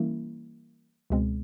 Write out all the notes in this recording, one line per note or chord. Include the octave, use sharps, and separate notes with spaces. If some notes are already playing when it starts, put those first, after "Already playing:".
Already playing: E3 G3 A#3 C#4 E4
C#2 B2 G#3 C4